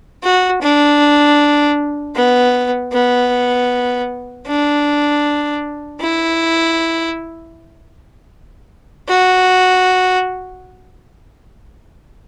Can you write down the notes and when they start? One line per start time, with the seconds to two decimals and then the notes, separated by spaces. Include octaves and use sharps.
0.23 F#4
0.62 D4
2.15 B3
2.92 B3
4.47 D4
6.00 E4
9.09 F#4